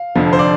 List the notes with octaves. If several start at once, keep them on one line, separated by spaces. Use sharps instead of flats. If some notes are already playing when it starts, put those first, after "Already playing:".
Already playing: F5
F1 F2 D3 F3
C5
D5